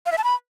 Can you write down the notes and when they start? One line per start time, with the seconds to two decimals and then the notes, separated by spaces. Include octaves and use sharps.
0.06 F5
0.12 E5
0.18 A5
0.24 B5